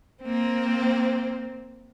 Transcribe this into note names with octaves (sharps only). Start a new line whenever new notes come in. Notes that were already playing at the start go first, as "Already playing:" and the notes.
A#3 C4